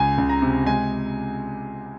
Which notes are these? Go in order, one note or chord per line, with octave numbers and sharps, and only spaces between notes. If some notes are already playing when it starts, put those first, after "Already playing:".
Already playing: C#2 C#3 G#5
C#2
A#5
C3
G#3 G#5